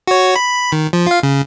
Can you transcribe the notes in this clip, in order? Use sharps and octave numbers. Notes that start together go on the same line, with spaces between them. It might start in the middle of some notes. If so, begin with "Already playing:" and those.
F#4 C#5
B5
D#3
F3
F4 F5
C#3